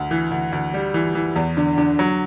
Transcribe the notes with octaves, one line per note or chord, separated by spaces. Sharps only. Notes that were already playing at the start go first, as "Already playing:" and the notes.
Already playing: D2
E3
D2
D2
G3
E3
E3
E2
D3
D3
F#3